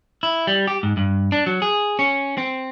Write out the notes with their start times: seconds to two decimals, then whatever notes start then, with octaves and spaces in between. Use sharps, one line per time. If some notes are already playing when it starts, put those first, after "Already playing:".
0.23 E4
0.47 G3
0.67 G4
0.83 G#2
0.97 G2
1.32 D4
1.46 F#3
1.62 G#4
1.99 C#4
2.38 C4